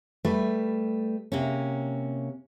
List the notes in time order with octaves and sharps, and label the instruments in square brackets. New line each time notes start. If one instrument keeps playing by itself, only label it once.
[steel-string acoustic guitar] G3 A3 B4
C3 A#3 C#4